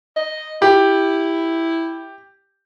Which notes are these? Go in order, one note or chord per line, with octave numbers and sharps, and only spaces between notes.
D#5
E4 G4